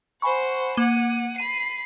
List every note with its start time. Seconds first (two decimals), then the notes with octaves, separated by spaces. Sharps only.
0.22 C5 F#5 G#5 B5 C#6
0.77 A#3 F#5 D#7
1.38 B5 C7 D#7